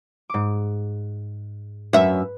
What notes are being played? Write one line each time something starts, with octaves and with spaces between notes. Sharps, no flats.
G#2 D6
F#2 B4 E5